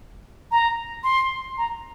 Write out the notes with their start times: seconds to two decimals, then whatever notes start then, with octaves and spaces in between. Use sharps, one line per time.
0.51 A#5
1.04 C6
1.58 A#5